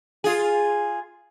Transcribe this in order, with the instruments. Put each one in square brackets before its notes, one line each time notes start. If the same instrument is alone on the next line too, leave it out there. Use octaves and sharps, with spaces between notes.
[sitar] F4 G#4